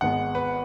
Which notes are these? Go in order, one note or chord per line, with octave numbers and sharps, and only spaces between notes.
G#1 G#2 G#3 B3 F#5
B4